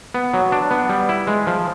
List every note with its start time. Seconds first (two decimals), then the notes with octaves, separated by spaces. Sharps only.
0.14 B3
0.34 F#3
0.52 D4
0.71 B3
0.89 G3
1.09 E4
1.27 G#3
1.47 F3